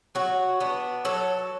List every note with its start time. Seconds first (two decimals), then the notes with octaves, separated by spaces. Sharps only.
0.15 F#3 F#4
0.60 B3 D4
1.05 F#3 A4